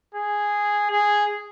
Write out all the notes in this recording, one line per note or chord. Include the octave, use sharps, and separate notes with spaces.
G#4
G#4